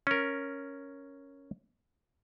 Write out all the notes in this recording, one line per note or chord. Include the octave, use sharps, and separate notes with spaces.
C#4 A#4